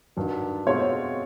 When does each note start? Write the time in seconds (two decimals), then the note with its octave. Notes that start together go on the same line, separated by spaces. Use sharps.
0.17 G2 D#3 F#3
0.66 B2 G#3 C4 F4 C#5